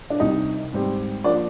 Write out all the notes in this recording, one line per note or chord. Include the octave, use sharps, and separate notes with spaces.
D4
C2 C3 G3 D#4
G#2 G3 C4 G4
F3 A#3 D4 D5